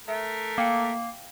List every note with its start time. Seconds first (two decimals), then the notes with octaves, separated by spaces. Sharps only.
0.08 A3 A#4 E5
0.58 A#3 F5 G5 C#7